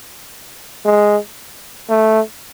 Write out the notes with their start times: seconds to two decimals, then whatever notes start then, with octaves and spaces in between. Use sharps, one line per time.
0.85 G#3
1.89 A3